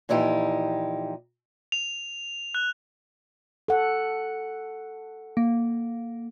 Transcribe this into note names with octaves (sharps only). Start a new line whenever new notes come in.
A#2 E3 F3 D#4 E4 G4
F7
F#6
A4 F#5
A#3